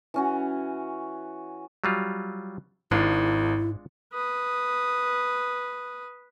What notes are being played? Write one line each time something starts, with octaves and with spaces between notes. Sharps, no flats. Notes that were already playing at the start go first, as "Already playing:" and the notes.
E3 C#4 F#4
F#3 G3 F4
G#1 G#2 G#3 D4 E4 F4
B4 D#6